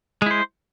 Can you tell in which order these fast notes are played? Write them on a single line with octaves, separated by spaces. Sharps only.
G#3 E4 C5